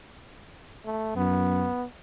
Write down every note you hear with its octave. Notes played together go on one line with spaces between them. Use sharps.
A3
F#2 B3